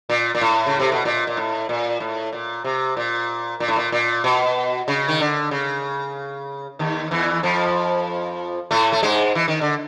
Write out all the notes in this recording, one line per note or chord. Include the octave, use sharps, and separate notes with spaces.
A#2
A#2
A2
C#3
C3
B2
A#2
A#2
A2
A#2
A2
A#2
C3
A#2
A#2
A2
A#2
A#2
B2
C#3
D#3
D3
C#3
D#2 D#3
E2 E3
F2 F3
A2 A3
A3
G#2 G#3
E3
D#3
D3